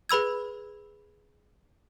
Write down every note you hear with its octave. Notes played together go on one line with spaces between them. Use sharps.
G#4 B4 B5 E6 G#6